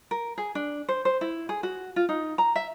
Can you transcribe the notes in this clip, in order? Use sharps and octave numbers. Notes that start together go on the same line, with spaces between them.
A#4
G#4
D4
C5
C5
E4
G#4
F#4
F4
D#4
A#5
E5